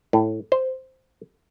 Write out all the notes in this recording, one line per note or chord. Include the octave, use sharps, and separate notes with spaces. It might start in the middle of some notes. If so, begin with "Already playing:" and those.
A2
C5